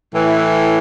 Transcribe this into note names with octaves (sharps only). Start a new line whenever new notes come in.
A2 E3